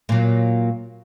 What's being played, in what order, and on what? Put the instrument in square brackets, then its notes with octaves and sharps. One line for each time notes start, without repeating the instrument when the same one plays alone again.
[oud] A#2 F#3